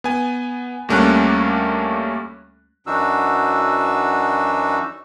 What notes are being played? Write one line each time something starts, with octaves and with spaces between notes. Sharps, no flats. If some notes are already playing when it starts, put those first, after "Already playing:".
B3 G#5
D2 G3 A3 A#3 C#4 F#6
F#2 E3 D4 D#4 F#4 E6